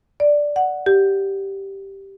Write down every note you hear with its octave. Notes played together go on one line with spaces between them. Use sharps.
D5
F#5
G4